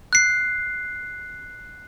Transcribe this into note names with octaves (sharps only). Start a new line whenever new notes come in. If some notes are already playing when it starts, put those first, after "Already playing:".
F#6 C7